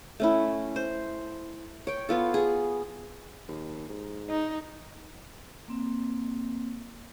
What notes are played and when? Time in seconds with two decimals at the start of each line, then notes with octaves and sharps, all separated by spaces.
0.20 A3 C#4 E4
0.76 C5
1.87 C#5 G5
2.09 B3 F4 A4
2.34 G#4
3.48 D#2
3.89 G#2
4.30 D#4
5.68 A#3 C4